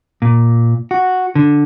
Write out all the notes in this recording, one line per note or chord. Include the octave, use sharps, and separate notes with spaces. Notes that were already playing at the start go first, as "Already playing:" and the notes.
A#2
F#4
D3